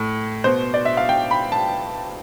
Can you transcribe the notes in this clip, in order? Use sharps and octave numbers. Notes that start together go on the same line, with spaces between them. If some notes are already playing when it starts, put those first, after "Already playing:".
Already playing: A2
B2 C5
D5
E5
F5
G5
B5
A5